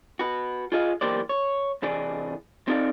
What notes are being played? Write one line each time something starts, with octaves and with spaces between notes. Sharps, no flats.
F#4 B4
F4 G#4 D#5 F5
B1 E3 A#3 G4 C5 D5
C#5
C3 E3 G#4 D5
C4 D#4 A4 D5 F5